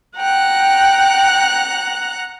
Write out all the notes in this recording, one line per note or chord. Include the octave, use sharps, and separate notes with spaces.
F#5 G5 A#5 F#6